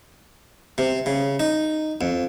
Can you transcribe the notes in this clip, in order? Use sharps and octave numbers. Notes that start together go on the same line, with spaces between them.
C3
C#3
D#4
F2